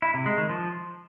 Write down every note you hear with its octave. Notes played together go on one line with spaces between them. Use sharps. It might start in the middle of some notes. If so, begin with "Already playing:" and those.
E4
C3
G#3
D#3
F3